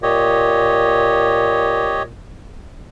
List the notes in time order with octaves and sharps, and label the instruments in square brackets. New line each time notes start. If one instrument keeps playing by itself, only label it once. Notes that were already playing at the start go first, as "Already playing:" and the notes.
[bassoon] A#2 [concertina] G4 C#5 D#5